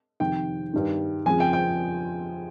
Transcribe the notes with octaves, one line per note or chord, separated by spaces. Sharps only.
F2 C3 D#3 G5
G2 D#3
F2 C#3 F3 G#5
G5
G5